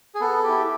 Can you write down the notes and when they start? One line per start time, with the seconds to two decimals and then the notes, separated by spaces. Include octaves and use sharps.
0.15 G#4
0.21 B3 A4
0.44 E4 G4